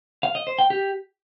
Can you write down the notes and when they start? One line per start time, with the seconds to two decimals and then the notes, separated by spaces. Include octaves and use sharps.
0.23 F5
0.35 D#5
0.47 C5
0.59 G5
0.70 G4